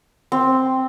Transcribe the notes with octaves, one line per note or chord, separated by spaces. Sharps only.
C4